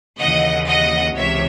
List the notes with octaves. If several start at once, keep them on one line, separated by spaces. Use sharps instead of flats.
D#2 C#3 E3 D#5 F#5
D#5 F#5
C#2 C3 E3 C#5 E5